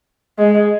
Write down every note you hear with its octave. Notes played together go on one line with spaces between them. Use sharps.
G#3